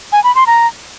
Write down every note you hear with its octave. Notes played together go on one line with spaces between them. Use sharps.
G#5
B5
C6
A#5